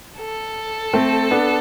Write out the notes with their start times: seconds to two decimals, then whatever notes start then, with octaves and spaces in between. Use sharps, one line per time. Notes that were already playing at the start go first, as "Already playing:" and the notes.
0.18 A4
0.93 A3 C4
1.31 B3 D4